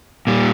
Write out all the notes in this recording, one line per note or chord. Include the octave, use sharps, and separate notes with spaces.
A#2 G3